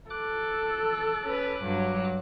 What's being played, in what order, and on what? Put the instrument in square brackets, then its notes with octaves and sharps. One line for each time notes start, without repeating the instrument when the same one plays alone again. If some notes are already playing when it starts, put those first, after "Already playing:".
[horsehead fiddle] A4 [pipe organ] D6 F#6
[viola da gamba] C#4 B4
G2 F#3